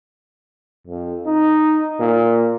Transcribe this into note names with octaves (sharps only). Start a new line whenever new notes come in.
F2
D#4
A#2